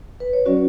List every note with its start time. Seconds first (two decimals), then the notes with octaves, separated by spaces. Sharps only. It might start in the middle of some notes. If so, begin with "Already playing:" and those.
0.20 B4
0.33 C#5
0.46 F#3 C#4 F#4 D5